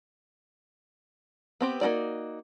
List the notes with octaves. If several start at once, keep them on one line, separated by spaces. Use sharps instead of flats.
B3 C4 G4
A#3 C4 D#4 F#4 D5